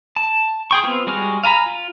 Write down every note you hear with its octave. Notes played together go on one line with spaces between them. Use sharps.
A5
G#4 G5 C#6
B3 C4 F4
G3 G#3 F#4 G#5 F6
F5 G#5 A#5 B5
F4